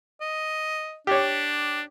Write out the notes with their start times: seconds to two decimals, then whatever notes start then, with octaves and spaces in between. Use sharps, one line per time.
0.21 D#5
1.07 D4 G4 C#5